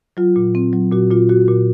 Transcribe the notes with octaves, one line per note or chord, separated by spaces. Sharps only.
F#3 F4
A#2
C4
F#3
A#2 F#4
A#2 F4
A#2 F#4
A#2